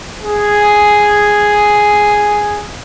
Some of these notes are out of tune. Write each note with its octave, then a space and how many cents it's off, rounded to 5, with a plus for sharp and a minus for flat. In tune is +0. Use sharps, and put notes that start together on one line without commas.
G#4 +0